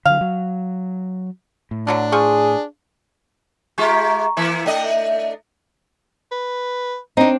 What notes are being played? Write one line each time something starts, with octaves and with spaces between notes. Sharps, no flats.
D3 F#3 F5
F#3
A2
B2 D3 F#3 D4
F3 F4 G#4 C#6
G#3 F4 G4 A#5 C#6
E3 A#3 E4
A3 D4 D#5 G5
E5
B4
C4 D4 D#4